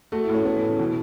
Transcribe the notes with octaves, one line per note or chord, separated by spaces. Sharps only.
A3 F#4
E4
A2
C#4
A3 B3
E3
A2
C#3
B2 E3